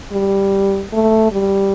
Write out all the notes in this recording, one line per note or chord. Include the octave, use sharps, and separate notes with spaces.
G3
A3
G3